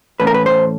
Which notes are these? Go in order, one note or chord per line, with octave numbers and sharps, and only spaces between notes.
A2 E3 A3 C#4 B4
A#4
B4
C5